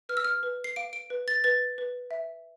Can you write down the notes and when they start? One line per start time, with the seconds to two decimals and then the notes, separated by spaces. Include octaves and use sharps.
0.09 B4 F6
0.17 E6
0.25 F6
0.43 B4
0.64 C7
0.76 F5 D7
0.93 D7
1.10 B4
1.28 A6
1.44 B4 A6
1.78 B4
2.11 E5